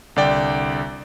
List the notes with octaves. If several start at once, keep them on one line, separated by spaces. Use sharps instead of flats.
C2 D3 D5 G5